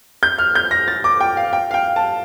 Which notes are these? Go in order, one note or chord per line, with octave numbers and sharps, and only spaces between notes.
G6
F6
G6
A#6
A6
D6
G5
F5
G5
F5
G5
A5